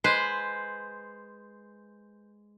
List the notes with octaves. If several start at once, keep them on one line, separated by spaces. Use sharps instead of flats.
G#3 B4 C5